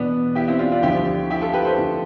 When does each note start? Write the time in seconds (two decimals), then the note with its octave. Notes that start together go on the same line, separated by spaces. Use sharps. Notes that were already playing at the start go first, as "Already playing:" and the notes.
Already playing: E2 B2 B3 D4
0.35 E4 G4
0.48 C4 E4
0.59 D4 F4
0.72 D4 F4
0.82 D2 D3 F3 E4 G4
1.30 E4 G4
1.42 F4 A4
1.53 G4 B4
1.65 A4 C5
1.78 D2 D3 F3